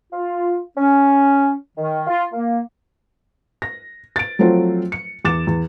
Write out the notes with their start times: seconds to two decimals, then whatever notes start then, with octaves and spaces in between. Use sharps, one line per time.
0.13 F4
0.77 C#4
1.78 D#3
2.07 F4
2.33 A#3
3.62 A#6
4.16 A6 D7
4.39 F3 F#3 A3 C4 F4
4.92 C#7
5.25 E2 D6 A6 E7
5.47 E2